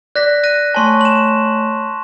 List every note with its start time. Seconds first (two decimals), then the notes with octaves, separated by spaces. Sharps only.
0.16 D5 F#6 A#6 B6
0.43 F#6 A#6 D#7
0.75 A3 C#5 G#5 A5 C6 C#6
1.01 E7 F#7